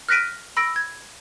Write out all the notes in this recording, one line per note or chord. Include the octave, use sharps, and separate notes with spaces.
F6 F#6 A#6 B6 D7 D#7
B5 E6 A#6 D7
G#6